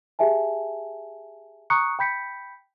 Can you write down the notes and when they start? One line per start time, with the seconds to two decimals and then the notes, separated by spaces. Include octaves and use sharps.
0.19 G4 G#4 E5 G#5 A5
1.70 A#5 C#6 D#6 F#6 C#7
1.99 G5 B5 G6 B6 C#7